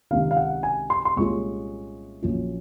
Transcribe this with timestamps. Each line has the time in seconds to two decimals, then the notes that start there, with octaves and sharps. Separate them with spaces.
0.11 C#2 C3 D#3 F5
0.31 F5
0.37 F#5
0.63 G#5
0.90 C6
1.05 C6
1.16 C2 A#2 G#3 C#4 F4 C#6
2.22 A#1 A#2 F#3 C#4 F4